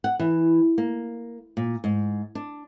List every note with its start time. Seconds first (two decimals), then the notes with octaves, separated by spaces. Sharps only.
0.04 F#5
0.19 E3
0.78 A#3
1.57 A#2
1.84 G#2
2.35 D4